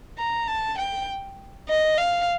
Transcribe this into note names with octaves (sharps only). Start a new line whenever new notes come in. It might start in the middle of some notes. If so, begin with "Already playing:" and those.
A#5
A5
G5
D#5
F5